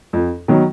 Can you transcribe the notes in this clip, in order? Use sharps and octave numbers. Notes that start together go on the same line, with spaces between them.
F2
D#3 F#3 B3